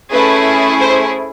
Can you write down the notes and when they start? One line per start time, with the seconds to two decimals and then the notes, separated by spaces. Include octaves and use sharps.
0.11 A3 C#4 E4 G#4 B4
0.81 C5